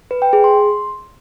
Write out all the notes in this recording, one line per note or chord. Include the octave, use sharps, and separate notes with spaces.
B4
G5
G#4
C6